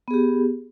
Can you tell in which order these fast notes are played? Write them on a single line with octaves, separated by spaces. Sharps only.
B3 G#4 G4